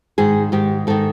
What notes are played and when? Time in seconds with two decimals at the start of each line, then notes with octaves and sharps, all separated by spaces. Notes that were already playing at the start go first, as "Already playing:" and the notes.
0.18 G#2 D#3 G#4
0.52 G#2 D#3 G4
0.87 G#2 D#3 A4